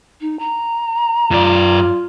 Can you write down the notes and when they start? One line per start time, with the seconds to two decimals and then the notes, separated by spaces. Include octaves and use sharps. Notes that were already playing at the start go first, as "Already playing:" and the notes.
0.21 D#4
0.39 A#5
1.31 F#2 F4 D5